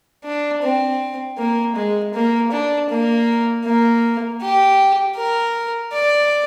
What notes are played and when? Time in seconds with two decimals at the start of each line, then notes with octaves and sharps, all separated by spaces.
0.24 D4
0.62 C4
1.38 A#3
1.75 G#3
2.14 A#3
2.51 D4
2.89 A#3
3.65 A#3
4.41 G4
5.16 A#4
5.93 D5